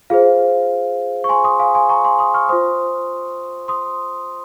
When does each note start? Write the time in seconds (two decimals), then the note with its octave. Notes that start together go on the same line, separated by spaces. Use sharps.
0.10 F4 G#4 C5 F5
1.24 C#6
1.29 G#5 C6
1.44 C6 D#6
1.59 F5 G#5
1.75 G#5 C6
1.89 A#5 C#6
2.04 G#5 C6
2.19 C6 D#6
2.34 C#6 F6
2.49 F4 C5 C6 D#6
3.68 C6 D#6